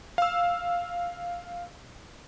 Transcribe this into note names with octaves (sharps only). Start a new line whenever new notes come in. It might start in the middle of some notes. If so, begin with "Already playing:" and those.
F5 E6